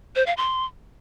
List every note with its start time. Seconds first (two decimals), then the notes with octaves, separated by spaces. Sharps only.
0.16 C5
0.26 F5
0.37 C6